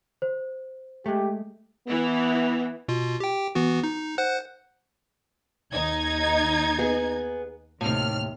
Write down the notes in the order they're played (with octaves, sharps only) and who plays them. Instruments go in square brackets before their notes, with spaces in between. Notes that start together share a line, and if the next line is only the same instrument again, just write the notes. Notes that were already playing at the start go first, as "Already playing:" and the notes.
[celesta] C5
[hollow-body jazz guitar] G#3 A3 [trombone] G4
[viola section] E3 E4 [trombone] B3
[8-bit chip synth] B2 F4
G4 G5
E3 B3 F#4
D#4
C5 F#5 F#6
[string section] D#2 D#4 G#6
[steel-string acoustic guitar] B3 G#4
[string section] D#2 F6 [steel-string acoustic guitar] A2 C3